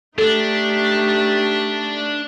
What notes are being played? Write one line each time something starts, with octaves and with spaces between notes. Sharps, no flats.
A3 D4 D#4 G4 A4